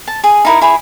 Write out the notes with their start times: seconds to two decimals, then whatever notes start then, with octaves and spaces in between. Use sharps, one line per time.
0.07 A5
0.24 G#4
0.45 D#4 E4 A#4
0.61 E4 G#4 B5